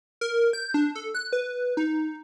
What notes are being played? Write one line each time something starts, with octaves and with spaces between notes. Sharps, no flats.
A#4
G6
D4
A4
F#6
B4
D#4